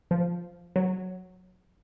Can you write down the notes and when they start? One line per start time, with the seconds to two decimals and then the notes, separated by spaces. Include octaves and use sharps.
0.11 F3
0.76 F#3